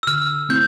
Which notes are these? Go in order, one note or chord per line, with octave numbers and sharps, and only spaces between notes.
E6
D3 F6
A3 C4 E4 G6